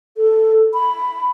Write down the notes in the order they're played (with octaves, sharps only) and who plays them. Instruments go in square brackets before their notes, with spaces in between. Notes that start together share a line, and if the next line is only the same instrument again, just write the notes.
[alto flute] A4
B5